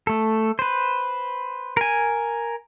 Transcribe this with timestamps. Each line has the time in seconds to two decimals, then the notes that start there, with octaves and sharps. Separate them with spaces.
0.07 A3 A4
0.59 B4 C5
1.77 A#4 G#5